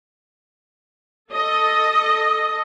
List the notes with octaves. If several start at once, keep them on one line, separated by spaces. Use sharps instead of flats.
A4 D#5